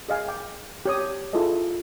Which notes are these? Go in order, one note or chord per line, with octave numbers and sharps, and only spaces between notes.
G#4 D#5 F5 G#5
G5 D6
G4 C#5 D#6
E4 F4 G#4 A4 D#5